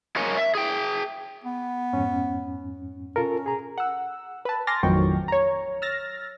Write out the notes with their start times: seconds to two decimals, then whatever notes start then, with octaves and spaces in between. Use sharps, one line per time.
0.16 G#3 A#3 A#4 C#5 G#5
0.37 E5
0.55 G#4 G5
1.44 B3
1.93 F2 G#2 C#4
3.16 C#4 F4 A4 A#4
3.46 G#4 A#5
3.78 F#5 E6
4.45 B4 A5
4.67 G#5 C6 D6 F6 A6 A#6
4.83 A1 F2 D#3 F#3 G5 C#6
5.28 C#5 A#5
5.82 E6 F6 A6 A#6